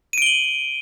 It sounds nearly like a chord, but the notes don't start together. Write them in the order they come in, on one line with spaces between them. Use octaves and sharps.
D#7 D7 G7 F#7